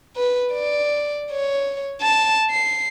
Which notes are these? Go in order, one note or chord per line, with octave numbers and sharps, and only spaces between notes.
B4
D5
C#5
A5
C7